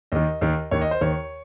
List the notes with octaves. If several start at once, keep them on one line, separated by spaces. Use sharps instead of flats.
D#2 D#3 D#5
D#2 D#3
D#2 D#3 C#5
D#5
C5
D#2 D#3 C#5